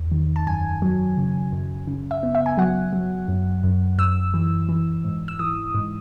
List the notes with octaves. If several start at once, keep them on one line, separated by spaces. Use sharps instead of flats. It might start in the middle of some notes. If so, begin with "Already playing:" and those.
Already playing: E2
D#3
A5
F#2 G#5
F#3
C#3
F#2
C#3
E5
B3
E5
G#5
F#3 F#5
F#3
F#2
F#2
F#2 E6
E3
E3
G#2
E6
E3 D#6
G#2